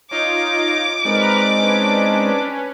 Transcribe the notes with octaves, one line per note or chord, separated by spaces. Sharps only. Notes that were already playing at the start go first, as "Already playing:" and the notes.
D#4 F4 C#5 D#5 D6
G#3 C4 D#4 A#4 B4 D5
C#4 D4 B4